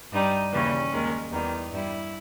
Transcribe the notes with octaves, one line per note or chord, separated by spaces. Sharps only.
G2 G3 D#4
D#2 C#3 E3 G3 C#4
D#2 D#3 G#3
E2 D#3 G3 D#4
G2 G3 E4